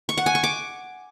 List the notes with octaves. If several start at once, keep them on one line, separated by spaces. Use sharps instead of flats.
C#6
F#5
G#5
C#6
D6